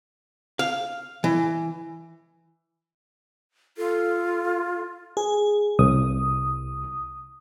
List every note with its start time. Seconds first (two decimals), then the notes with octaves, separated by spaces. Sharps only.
0.59 F5
1.24 E3
3.78 F4 A4
5.17 G#4
5.79 C2 D#6